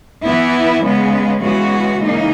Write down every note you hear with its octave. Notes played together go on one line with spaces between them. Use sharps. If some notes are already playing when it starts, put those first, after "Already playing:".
E3 B3 E4
C#3 G#3 B3
C#3 E3 G#3 B3 F#4
C#3 E3 A#3 D#4